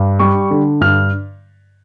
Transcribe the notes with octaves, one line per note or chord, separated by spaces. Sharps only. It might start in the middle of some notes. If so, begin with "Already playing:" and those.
Already playing: G2
G3 C#6
D3
G2 F6